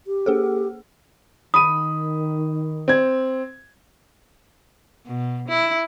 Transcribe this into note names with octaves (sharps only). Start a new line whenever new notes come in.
G4
A#3 G#4 A4
D#3 B5 D#6 D#7
C4 G#6
B2
E4